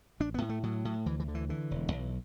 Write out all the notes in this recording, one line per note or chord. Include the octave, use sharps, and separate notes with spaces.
A1 D4
B3
A2
A3
A2 F#3
A2
D2 E3
E3
D3
E3
D3 E3
E1
B1